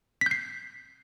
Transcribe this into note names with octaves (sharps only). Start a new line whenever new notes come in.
G6 B6 C7